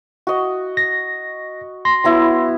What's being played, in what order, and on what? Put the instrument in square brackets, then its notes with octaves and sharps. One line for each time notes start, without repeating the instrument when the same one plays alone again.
[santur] F#4 D#5
[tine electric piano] A#6
C6 A#6
[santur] F#3 B3 E4